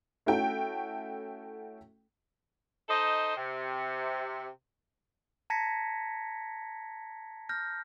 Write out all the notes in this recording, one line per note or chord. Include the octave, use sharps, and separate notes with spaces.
A3 C#4 E4 F#4 A4 G5
D#4 A4 C5 D#5
C3
A5 A#5 G#6 A#6 B6 C#7
F6 G6 A#6